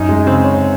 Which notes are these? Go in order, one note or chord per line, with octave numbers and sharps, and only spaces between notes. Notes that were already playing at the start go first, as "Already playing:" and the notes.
Already playing: F#2 D#4
G#3
C#3 C4
C#4